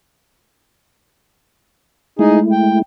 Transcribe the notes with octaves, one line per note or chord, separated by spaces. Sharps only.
G#3 A3 D#4 E4 G#4
G5